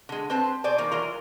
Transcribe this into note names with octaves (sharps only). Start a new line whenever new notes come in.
D3 G#3
C4 B4 C5 A5
B2 C5 D5 G#5
D#3 A#3
E3 F#3 F4 A#4